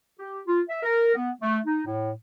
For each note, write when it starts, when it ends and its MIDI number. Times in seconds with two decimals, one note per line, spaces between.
0.18 0.40 67
0.46 0.61 65
0.69 0.82 76
0.83 1.12 70
1.15 1.31 59
1.41 1.58 57
1.66 1.81 63
1.86 2.11 45